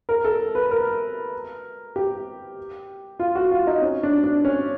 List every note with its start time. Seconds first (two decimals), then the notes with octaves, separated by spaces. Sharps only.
0.09 A#4
0.25 A4
0.55 B4
0.71 A#4
1.96 G4
3.19 F4
3.35 F#4
3.51 F4
3.67 D#4
3.82 C#4
4.03 D4
4.24 D4
4.45 C#4